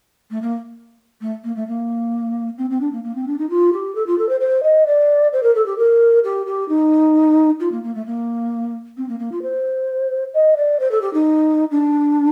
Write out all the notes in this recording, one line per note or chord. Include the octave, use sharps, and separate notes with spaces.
A3
A#3
A3
A#3
A3
A#3
C4
C4
D4
A#3
A#3
C4
D4
D#4
F4
G4
A4
F4
A4
C5
C5
D#5
D5
C5
A#4
A4
G4
A#4
G4
G4
D#4
F4
A#3
A#3
A3
A#3
C4
A#3
A#3
F4
C5
D#5
D5
C5
A4
G4
D#4
D4